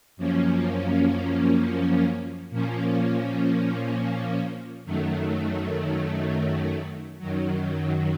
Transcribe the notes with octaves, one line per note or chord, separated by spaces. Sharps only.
F#2 F3 A#3 C#4
A#2 F3 A#3 C#4
F#2 D#3 F#3 A3
F#2 D#3 F#3